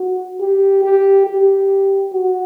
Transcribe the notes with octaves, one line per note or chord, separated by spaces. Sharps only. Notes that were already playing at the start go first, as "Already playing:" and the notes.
Already playing: F#4
G4
G4
G4
F#4